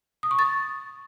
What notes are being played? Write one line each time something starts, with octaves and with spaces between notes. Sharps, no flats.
D#6
C#6
A6